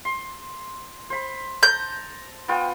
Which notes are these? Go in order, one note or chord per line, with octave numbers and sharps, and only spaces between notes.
C6
C5 B5
A5 A#5 G6
B3 F4 G5